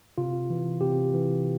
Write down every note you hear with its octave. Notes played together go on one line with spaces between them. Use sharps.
C3 F4
E3
C3 G4
E3